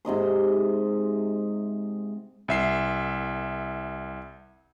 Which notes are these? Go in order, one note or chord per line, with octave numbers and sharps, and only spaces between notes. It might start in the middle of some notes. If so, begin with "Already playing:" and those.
G#2 C3 D#5 C6
C2 E5 C7